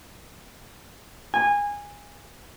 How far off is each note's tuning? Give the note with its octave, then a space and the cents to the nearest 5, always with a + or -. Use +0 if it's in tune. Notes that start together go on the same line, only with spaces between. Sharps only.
G#5 -20